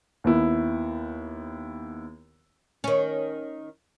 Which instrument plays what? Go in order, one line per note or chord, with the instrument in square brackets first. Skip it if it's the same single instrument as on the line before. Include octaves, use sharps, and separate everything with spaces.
[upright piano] D#2 B3 E4
[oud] D#3 C#4